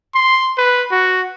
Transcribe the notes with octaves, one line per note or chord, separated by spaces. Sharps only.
C6
B4
F#4